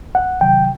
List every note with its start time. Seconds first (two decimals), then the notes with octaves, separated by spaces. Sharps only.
0.15 C#2 F#5
0.41 C3 D#3 F#3 G5